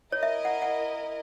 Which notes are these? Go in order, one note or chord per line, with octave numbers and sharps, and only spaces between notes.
E4 A#4 C#5 D#5
E5
F#5
F#5